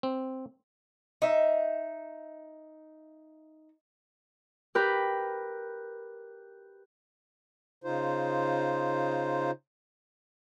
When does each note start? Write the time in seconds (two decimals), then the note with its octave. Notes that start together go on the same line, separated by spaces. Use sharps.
0.03 C4
1.22 D#4 E5
4.75 G4 A#4 B4 G6
7.84 C#3 D#4 F4 C5